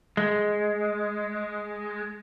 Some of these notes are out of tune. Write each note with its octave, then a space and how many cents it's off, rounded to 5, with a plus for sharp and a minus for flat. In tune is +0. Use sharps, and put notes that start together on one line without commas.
G#3 +5